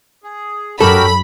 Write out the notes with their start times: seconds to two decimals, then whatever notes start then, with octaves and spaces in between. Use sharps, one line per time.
0.24 G#4
0.80 F#2 F#4 G4 A4 A#4 B5